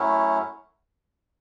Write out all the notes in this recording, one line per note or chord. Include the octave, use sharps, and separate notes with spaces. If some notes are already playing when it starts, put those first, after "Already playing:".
Already playing: F#2 F#3 A3 C#4 E4